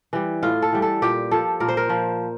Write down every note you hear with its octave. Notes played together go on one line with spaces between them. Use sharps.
E3 G3
A2 F4
A4
E3 G3
A4
A#2 G4
F3 A4
A#2 A#4
C5
A#4
F3